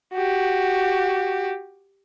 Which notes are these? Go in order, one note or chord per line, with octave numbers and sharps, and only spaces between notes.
F#4 G4